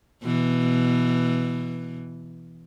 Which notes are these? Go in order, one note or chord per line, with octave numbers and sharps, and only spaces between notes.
B2 E3